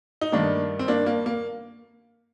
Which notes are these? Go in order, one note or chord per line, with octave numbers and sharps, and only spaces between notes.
D#4
G2 D#3 A3 A#3 D4
C4
A#3 D4
A#3
A#3